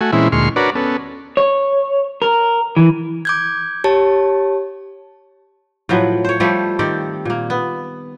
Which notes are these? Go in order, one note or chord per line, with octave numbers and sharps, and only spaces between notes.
A3 F#4 G#5
A#2 E3 G#3 C4 C#4 E4
D2 A#2 G#3 C6 C#6 F6
D4 F#4 A#4 B4 C#5 D5
B3 C#4 A4
C#5
A#4
E3
D6 G6 G#6
G4 C#5 A5
A2 F3 F#3 B4
C5 C#5
F3 G3 A3 G4
D#3 C4 G4 D5
A#2 A#3
B3